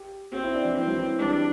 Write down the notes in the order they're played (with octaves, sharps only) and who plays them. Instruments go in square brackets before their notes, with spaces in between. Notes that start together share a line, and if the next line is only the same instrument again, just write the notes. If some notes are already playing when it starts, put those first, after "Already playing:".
Already playing: [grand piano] G4
[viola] C4 [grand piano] F#4
[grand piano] E4
D4
E3
[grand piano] E3 [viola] C4
[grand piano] F#3
E3
[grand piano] G3 [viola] D4